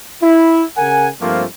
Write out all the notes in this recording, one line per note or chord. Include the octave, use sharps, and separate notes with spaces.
E4
C#3 A#4 F#5 G#5
G2 F3 A3 A#3 C4 F4